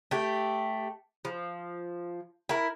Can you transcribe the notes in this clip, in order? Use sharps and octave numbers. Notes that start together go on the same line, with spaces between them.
A3 G4
F3
E4 A#4